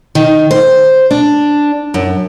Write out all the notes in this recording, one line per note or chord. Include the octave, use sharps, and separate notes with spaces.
D#3
C5
D4
F#2